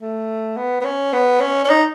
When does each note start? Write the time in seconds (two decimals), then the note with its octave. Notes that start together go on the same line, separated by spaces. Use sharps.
0.01 A3
0.57 B3
0.81 B3
0.85 C#4
1.13 B3
1.41 C#4
1.64 C#4
1.70 D#4